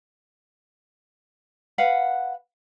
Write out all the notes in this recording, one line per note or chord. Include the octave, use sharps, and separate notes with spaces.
B4 F5 F#5